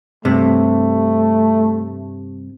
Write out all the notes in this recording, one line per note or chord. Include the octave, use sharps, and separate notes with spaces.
G2 C3 A3